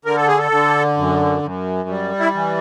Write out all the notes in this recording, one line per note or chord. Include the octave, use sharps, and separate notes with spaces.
D3 A#4
A4
G#4
A4
D3
F#2
F#2
G3
E4
E3